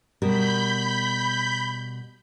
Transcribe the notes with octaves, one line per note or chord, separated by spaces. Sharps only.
B2 G3 A#4 B5 G6 B6